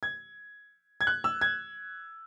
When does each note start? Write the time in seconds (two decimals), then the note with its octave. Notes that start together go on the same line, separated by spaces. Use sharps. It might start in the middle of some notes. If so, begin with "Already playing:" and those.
0.03 G#6
1.01 G#6
1.07 F#6
1.24 E6
1.41 G#6